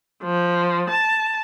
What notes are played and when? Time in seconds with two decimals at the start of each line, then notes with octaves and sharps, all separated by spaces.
0.23 F3
0.89 A5